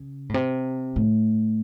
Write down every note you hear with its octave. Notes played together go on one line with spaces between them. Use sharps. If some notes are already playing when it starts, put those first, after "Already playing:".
Already playing: C#3
A2
C3
A2